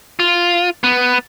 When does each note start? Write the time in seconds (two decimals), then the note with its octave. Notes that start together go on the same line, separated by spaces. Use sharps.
0.20 F4
0.84 B3